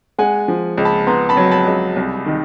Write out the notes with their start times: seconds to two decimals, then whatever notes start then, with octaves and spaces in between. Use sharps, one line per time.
0.18 G#3 F#5 G#5
0.48 F3
0.77 C#2
0.85 A5 B5
1.07 B3 A#5 C6
1.29 A5 B5
1.37 F#3
1.51 A5 B5
1.67 C#2
1.96 C2
2.26 D#3